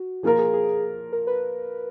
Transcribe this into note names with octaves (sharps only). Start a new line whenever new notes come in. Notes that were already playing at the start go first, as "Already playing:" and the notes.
Already playing: F#4
F3 A#3 F4 G#4 A#4
G#4
G#4
A#4
B4